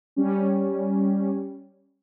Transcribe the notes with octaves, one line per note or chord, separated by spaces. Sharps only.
G3 C#4